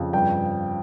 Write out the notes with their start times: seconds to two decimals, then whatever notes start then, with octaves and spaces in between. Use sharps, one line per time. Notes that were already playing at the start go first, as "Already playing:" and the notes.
Already playing: F2 C#3
0.13 G2 G5